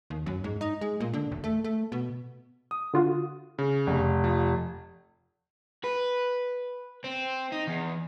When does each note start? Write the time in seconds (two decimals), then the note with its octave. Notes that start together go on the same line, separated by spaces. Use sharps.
0.10 D#2
0.26 F#2
0.44 G#2
0.61 D#4
0.81 G#3
1.00 A#2
1.13 D3
1.31 E1
1.44 A3
1.64 A3
1.92 B2
2.71 D#6
2.94 D3 F4 F#4
3.58 C#3
3.87 F1
4.24 F3
5.84 B4
7.04 C4
7.52 D#4
7.68 E2